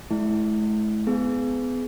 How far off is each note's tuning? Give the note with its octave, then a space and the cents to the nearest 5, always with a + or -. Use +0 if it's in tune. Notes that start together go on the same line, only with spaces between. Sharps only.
A3 -45 E4 -10
B3 +30 G#4 +15